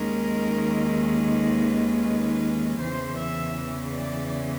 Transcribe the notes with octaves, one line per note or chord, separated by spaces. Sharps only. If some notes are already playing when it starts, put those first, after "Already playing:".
Already playing: D#2 D#3 G#3 C#4 A#4
B4
E2 C#3 E3 C5
E5
D5